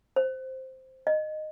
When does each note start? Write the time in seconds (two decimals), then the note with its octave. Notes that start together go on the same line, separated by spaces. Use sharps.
0.16 C5
1.07 D#5